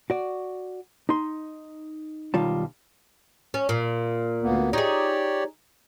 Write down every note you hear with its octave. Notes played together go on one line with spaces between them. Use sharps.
F#4 D5
D#4 C6
B1 D#3 G3 F4 A5
C#4
A#2
D2 A#3 B3
D#4 G4 G#4 C#5 D5